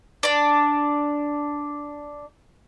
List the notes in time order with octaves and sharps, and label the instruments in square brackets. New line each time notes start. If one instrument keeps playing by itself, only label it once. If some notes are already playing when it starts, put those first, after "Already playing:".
[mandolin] D4 D5